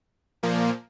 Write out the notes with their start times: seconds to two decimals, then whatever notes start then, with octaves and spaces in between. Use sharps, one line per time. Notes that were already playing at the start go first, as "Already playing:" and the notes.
0.43 A#2 F3 A#3